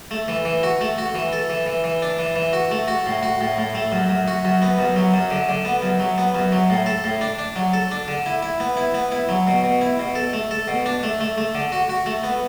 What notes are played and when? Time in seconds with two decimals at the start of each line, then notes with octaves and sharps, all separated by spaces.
0.11 A3
0.28 E3
0.45 E3
0.63 F#4
0.81 A3
0.98 F#4
1.15 E3
1.33 A4
1.50 E3
1.66 E3
1.84 E3
2.02 D4
2.19 E3
2.36 E3
2.53 F#4
2.71 A3
2.88 F#4
3.06 A2
3.23 F#4
3.41 A2
3.58 A2
3.75 A3
3.92 F#2
4.09 F#2
4.28 F#4
4.45 F#2
4.62 B3
4.79 F#2
4.96 F#3
5.14 F#2
5.31 D3
5.49 D3
5.65 B3
5.82 F#2
6.00 F#3
6.18 B3
6.35 F#2
6.52 F#3
6.70 A2
6.86 A4
7.04 A2
7.21 D4
7.39 D4
7.56 F#3
7.73 A4
7.91 D4
8.08 D3
8.26 E4
8.43 E4
8.60 B3
8.77 E4
8.94 B3
9.12 E4
9.29 F#3
9.47 B2
9.64 B2
9.81 E4
9.99 B2
10.15 A4
10.33 A3
10.51 A4
10.68 B2
10.86 D4
11.03 A3
11.21 A3
11.38 A3
11.55 D3
11.72 F#4
11.89 F#4
12.06 A3
12.23 B3